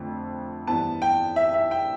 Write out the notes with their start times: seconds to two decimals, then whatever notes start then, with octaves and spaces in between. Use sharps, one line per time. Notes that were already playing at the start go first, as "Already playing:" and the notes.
Already playing: F2 D3 A3
0.67 G2 E3 B3 A5
1.02 G5
1.36 E5
1.54 E5
1.71 G5